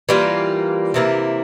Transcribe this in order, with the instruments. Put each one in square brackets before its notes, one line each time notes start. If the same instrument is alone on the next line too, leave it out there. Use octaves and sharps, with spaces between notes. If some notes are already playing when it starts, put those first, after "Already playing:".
[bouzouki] E3 G3 A#3 F4
C3 E3 A#3 E4